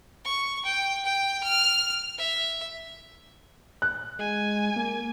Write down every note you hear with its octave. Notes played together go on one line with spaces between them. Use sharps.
C#6
G5
G5
F6
E5
F#6
G#3 G#5
A#3